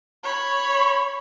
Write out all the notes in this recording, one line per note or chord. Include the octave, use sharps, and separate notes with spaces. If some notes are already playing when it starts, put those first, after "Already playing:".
C#5 B5